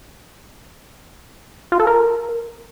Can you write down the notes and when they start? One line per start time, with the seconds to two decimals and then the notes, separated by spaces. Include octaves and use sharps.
1.72 F4
1.80 A4
1.87 A#4